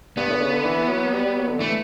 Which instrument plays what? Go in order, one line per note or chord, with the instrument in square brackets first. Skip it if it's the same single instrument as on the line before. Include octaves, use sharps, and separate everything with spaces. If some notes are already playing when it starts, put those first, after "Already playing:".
[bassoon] G2 [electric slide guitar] B3
[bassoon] A2
D3
C#3
D3
E3
F#3
G3
G3
F#3
D3
[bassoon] E3 [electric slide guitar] A3